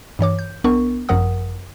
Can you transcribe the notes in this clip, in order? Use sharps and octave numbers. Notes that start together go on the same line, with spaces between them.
G2 E3 C#5 D6
G6
B1 B3 D4 A#4 C#6
G#1 F#2 F3 A#4 F#5 D#6